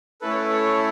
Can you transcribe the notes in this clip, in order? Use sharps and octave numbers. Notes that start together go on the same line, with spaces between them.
A3 C#4 E4 A4 B4
C#5
B4
C#5